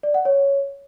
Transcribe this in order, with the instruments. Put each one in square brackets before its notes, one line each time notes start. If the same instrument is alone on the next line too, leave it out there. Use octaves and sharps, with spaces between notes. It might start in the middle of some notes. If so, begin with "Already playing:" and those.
[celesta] D5
F#5
C#5